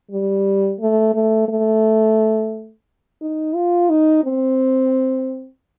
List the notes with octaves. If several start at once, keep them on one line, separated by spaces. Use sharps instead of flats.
G3
A3
A3
A3
D#4
F4
D#4
C4